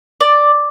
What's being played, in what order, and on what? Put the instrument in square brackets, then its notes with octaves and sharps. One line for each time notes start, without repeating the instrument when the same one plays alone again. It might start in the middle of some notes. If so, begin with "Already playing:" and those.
[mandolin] D5